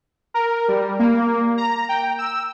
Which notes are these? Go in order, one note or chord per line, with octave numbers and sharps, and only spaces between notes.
A#4
G3
A#3
A#5
G5
E6